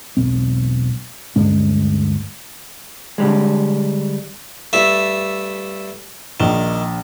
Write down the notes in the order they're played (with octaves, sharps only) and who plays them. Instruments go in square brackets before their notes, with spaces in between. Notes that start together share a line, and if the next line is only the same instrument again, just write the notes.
[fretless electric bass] E1 B1 C4
D2 G2 G#3 C#4
[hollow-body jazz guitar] D3 G3 G#3
[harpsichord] G2 A3 E5
[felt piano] A#1 [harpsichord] D#3